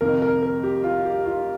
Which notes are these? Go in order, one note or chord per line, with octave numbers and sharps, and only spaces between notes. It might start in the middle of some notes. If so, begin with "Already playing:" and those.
F2 C3 D#3 A#3 A#4
A#4
A#4
G4
F4
G4
F4